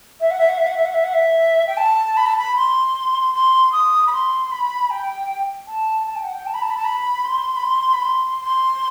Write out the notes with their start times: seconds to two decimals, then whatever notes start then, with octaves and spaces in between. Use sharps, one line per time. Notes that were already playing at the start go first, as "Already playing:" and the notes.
0.20 E5
0.31 F#5
0.39 E5
0.49 F#5
0.58 E5
0.67 F#5
0.77 E5
0.85 F#5
0.94 E5
1.04 F#5
1.14 E5
1.67 G5
1.77 A5
2.17 B5
2.26 A5
2.38 B5
2.56 C6
3.34 C6
3.72 D#6
4.07 B5
4.12 C6
4.51 B5
4.90 G5
5.68 A5
6.07 A5
6.16 G5
6.24 F#5
6.33 G5
6.47 A5
6.54 B5
6.62 A5
6.70 B5
6.77 A5
6.85 B5
7.24 C6
7.56 B5
7.63 C6
7.93 B5
8.02 C6
8.42 C6